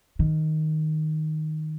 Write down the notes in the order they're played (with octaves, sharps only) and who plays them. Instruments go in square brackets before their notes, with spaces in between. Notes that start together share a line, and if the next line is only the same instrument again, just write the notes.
[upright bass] D#3